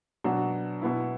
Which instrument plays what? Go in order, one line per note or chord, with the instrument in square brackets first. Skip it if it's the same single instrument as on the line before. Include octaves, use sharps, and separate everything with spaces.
[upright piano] B2 F#3 D4 F#4
B2 B3 E4